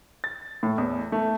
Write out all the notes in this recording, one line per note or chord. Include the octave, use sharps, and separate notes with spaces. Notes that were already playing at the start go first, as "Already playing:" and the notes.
A6
A2
E2
A3